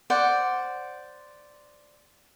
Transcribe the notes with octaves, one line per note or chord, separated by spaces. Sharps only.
C5 D5 F#5